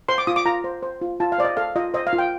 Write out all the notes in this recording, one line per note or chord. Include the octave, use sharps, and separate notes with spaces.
C5 C6
D6
F4 D#6
D6
F4 A#5
C5
C5
F4
F4 A5
F5
C5 D5
D#5
A4 F5
F4 D#5
C5 D#5
F5
F4
G5